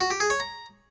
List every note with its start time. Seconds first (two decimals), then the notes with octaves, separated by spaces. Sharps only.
0.01 F#4
0.10 G4
0.20 G#4
0.30 C#5
0.40 A#5